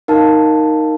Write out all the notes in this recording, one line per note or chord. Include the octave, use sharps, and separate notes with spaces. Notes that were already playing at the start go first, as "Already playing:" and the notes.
D#4 A#4 F5 A5